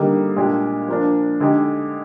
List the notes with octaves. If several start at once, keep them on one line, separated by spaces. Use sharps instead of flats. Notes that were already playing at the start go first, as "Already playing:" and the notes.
Already playing: D3 G3 A#3 D#4 G4
A#2 G#3 D4 G4
F3 A#3 D4
D3 G#3 D#4 G4